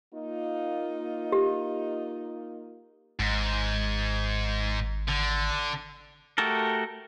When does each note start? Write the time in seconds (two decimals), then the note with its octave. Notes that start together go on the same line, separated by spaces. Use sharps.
0.15 A#3 D#4 F4
1.32 G4
3.19 G#1 G#2
5.08 D3
6.38 A3 F#4 G4 A4 A#4